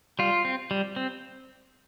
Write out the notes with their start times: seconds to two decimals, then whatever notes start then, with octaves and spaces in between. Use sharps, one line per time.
0.19 G3 F4
0.45 C4
0.71 G3
0.96 C4